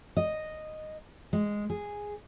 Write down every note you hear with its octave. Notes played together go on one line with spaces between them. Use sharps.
D#5
G#3
G#4